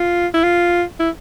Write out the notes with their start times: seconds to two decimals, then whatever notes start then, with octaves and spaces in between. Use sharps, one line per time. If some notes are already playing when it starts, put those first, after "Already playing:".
Already playing: F4
0.34 E4
0.43 F4
1.00 E4